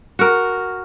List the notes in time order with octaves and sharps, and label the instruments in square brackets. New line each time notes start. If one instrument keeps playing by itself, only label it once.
[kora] F#4 A#4